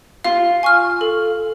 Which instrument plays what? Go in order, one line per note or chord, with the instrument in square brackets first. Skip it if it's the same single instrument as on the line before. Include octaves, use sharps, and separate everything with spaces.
[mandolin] F4 [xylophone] F5
[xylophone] G#5 C#6 F6
A4